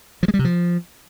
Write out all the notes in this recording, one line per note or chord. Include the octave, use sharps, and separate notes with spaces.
F3
G#3
G3
C3
F3